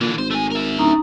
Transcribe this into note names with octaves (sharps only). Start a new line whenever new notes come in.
A#2 D3 E3
G#1 C5
A3 G#5
A#4 E5
D1 C#4 D#4 A#5